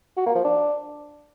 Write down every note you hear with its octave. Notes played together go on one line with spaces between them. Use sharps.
F#4
A#3
F3
D4